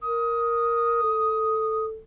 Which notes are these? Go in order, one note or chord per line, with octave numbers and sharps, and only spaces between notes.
A#4 D#6
A4